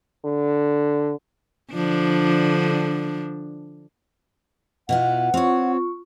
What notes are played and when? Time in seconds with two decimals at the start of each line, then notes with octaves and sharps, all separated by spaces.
0.25 D3
1.73 D3 F3 D4
4.89 B2 E4 F4 F#5
5.34 C4 F4 C#5 C#6